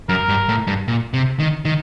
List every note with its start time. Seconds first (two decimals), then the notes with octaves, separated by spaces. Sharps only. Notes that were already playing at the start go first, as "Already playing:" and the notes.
0.09 F#2 A#4
0.29 G2
0.49 A2
0.67 G2
0.88 A#2
1.14 C3
1.39 D#3
1.65 D#3